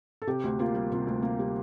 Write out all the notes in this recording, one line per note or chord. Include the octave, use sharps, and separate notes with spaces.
A4
C3 G4
D2
A#3 F4
G3
C3 F4
D2
A#3
G3